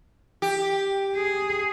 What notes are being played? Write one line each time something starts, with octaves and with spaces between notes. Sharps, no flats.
G4
G#4